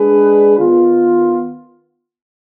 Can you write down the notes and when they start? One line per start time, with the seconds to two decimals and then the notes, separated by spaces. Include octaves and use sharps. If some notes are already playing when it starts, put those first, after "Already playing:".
Already playing: G#3 D4 G#4 B4
0.58 D#3 B3 F4